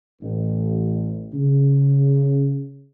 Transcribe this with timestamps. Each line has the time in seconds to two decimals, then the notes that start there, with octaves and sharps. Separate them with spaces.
0.21 A1
1.33 C#3